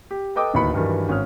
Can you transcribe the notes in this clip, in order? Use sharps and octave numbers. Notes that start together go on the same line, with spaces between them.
G4
A4 B4 D#5 G5 D6 D#6
D1 D#2 D#4 B4 B5 C#7
G2 D#3 E3 F#3 G3
G#1 C#4 D#6 F6